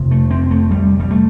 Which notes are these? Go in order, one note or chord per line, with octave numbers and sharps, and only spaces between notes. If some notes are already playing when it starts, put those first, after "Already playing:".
Already playing: F2 C3
A3
C4
A3
G3
G3
A3